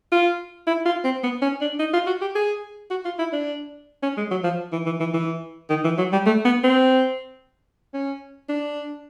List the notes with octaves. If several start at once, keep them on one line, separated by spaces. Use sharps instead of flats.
F4
E4
F4
C4
B3
C#4
D4
D#4
F4
F#4
G4
G#4
F#4
F4
E4
D4
C#4
G#3
F#3
F3
E3
E3
E3
E3
D#3
E3
F#3
G3
A3
B3
C4
C#4
D4